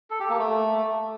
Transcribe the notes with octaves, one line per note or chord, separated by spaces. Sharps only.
A4
G4
A#3
A3